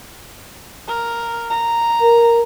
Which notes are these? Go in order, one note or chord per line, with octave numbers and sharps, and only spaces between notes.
A#4
A#5
A#4